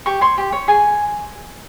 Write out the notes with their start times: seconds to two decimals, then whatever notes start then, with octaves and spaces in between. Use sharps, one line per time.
0.06 G4 C#6
0.21 C#5 C6
0.38 G4
0.52 C#5
0.68 G#4 G#5